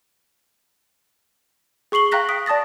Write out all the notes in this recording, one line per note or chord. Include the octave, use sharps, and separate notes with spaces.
G#4 C#6 C7 F#7 G7
F5 G5 A#5 F#6 A#6 B6
D#6 B6 D7
D5 A5 D#6 A6 A#6